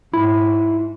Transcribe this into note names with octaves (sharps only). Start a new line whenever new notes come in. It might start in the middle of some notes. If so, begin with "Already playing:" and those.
G#2 E4